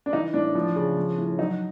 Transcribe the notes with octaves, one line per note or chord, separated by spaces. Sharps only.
D4
E3 D#4
A2 D4
F3
C#3
F3
A2
F#3 D#4